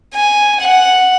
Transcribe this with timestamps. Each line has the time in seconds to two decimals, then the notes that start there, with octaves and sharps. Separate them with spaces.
0.15 G#5
0.61 F#5